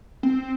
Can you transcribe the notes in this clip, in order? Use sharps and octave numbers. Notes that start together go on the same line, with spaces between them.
C4